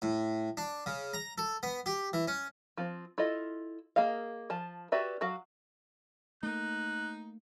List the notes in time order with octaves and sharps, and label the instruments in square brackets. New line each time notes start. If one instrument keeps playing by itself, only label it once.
[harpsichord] A2
D4
C#3
A#5
A4
B3
G4
E3
C#4
[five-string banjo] F3 C4
E4 F4 A4 D#5
A#3 G#4 D#5 F5
F3 A5
F#4 G4 B4 D5 E5
F#3 F#4 F5
[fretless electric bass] A3 A#3 [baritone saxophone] D#4 [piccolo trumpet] F#6